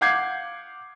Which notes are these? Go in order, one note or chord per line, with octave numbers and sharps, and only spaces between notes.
F5 F#5 D6 G6 G#6 C7